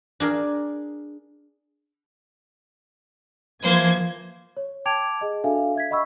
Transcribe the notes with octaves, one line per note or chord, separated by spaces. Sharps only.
D4 G#4 A#4
E3 F3 A#3 C5 G#6
C#5
G5 A5 D6 G#6 D7 F7
G#4 D#5 G5
D4 F#4 A4 E5 F5 G#5
E5 G#6 B6
D#5 F#5 B5 C#6 E6